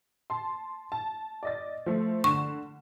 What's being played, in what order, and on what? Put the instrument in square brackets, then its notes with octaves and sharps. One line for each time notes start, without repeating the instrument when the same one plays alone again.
[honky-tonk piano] A5 C6
A5
D5 D#5 A6
F3 A3
[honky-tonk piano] D3 E7 [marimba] C#6